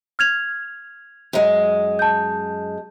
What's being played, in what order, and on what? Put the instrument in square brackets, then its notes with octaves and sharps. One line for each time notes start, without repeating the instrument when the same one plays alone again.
[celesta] F6 G#6 F7
[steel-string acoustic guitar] F#2 G#3
[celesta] A5 G6